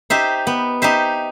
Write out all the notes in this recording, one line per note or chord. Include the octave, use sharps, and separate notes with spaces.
D#4 G4 C5 E5
B3
D#4 G4 C5 E5